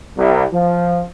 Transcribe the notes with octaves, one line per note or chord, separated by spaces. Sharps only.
C2
F3